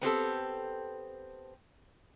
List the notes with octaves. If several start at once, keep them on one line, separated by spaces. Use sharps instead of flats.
B3 C4 G4 A4